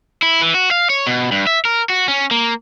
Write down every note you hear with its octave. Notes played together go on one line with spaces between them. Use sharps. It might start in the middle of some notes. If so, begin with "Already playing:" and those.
E4
E3
F#4
F5
C#5
B2
G2
E5
A#4
F#4
C#4
A#3